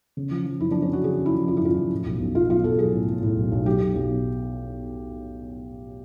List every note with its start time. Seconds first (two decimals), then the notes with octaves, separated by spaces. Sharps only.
0.17 C#3
0.31 F3
0.46 F3
0.60 F#2 E4
0.71 D4
0.75 F3
0.82 C#4
0.89 F#2 F#4
1.04 C#3 G#4
1.19 C#3
1.26 E4
1.33 F3
1.48 F#2 F4
1.57 E4
1.62 F#2 F4
1.77 F3
1.92 A2
2.06 B1
2.20 B1
2.35 B1 F4
2.49 F#3 F4
2.64 B1 A4
2.79 F#3 G#4
2.93 A2
3.08 A2
3.22 A2
3.37 B1
3.52 B1
3.66 F#3 G4
3.80 B1
3.95 B1